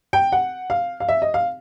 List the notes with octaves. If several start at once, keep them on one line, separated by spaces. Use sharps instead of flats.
G5
F#5
F5
F5
E5
D#5
F5